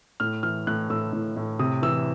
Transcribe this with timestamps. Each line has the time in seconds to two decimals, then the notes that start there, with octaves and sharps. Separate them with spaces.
0.20 A2 F6
0.43 E3 F6
0.67 A2 F#6
0.90 A2 E6
1.13 A2
1.36 A2
1.59 C3 D#6
1.82 E3 E6